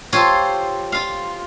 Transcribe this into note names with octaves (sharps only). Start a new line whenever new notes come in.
F4 G4 A4 C5 C#5
F4 F5